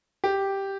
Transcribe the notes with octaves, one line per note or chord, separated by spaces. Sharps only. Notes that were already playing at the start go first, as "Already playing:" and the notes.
G4